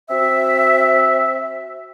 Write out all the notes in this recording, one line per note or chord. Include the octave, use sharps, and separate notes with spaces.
C4 F#4 E5